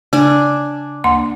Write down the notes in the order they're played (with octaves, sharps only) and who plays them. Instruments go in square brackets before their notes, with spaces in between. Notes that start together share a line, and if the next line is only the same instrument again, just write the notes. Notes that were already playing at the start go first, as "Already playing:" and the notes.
[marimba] C#3 [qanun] D4 G#5
[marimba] D2 A#3 C6